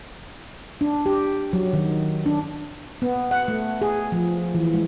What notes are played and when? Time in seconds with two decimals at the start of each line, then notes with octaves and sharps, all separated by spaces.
0.81 D4
1.06 G4
1.53 F#3
1.73 D#3
2.26 D4
3.02 B3
3.31 F#5
3.48 A3
3.82 G#4
4.12 F3
4.54 E3
4.74 G#3